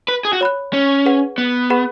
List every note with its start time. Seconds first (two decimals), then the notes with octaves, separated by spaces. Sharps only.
0.08 B4
0.25 G#4
0.33 F#4
0.41 C#5 B5 F#6
0.73 C#4
1.06 G#4 B4 F#5
1.38 B3
1.70 G#4 B4 F#5 B5